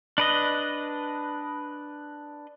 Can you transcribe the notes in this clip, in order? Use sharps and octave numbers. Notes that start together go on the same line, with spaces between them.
D4 B4 D#5